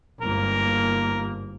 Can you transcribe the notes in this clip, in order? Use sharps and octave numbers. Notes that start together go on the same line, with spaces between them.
G1 G#2 A#3 A#4